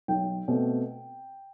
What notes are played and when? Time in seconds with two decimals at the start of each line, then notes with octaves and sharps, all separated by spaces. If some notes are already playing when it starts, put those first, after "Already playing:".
0.08 B1 G5
0.48 B2 A3 C4